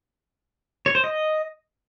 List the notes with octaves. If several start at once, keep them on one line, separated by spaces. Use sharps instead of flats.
C#5
C5
D#5